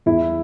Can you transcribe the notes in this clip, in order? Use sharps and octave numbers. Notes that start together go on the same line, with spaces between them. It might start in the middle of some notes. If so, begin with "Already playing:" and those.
E2 E4